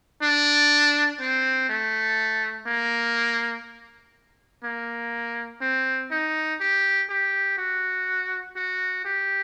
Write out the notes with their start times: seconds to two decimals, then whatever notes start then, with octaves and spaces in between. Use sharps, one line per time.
0.22 D4
1.21 C4
1.69 A3
2.67 A#3
4.64 A#3
5.61 C4
6.11 D#4
6.60 G4
7.09 G4
7.58 F#4
8.56 F#4
9.05 G4